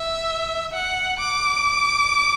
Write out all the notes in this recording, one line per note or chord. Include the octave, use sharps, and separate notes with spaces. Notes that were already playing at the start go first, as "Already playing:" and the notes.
Already playing: E5
F#5
D6